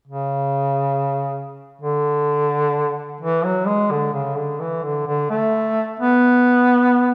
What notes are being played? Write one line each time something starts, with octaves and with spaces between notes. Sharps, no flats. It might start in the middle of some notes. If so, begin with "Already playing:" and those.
C#3
D3
E3
F#3
G#3
D3
C#3
D3
E3
D3
D3
A3
B3